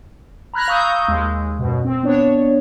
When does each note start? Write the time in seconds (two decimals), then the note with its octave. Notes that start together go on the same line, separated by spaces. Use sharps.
0.54 A#5 B5 F6 F#6 G#6 A#6
0.68 F5 A#5 C#6 D#6 E6 G6
1.08 D#2 G#3
1.59 F#2 B2
1.85 C4
2.03 B3 D4 C#5